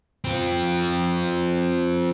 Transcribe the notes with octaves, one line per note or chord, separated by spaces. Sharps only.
C4 F4